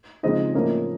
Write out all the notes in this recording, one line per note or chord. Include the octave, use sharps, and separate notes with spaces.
C#3 F3 G#3 C4 D#4 D#5
A2 F3 A#3 C#4 D#5